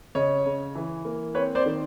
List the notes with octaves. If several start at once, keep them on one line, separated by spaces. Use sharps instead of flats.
C#3 C#5 D#5
C#3
E3
A#3
C4 B4 C#5
C5 D5
D#3